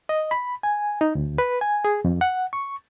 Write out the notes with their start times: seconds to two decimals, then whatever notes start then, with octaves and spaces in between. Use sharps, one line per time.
0.09 D#5
0.31 B5
0.63 G#5
1.01 D#4
1.15 D2
1.38 B4
1.61 G#5
1.85 G#4
2.05 F2
2.21 F#5
2.53 C#6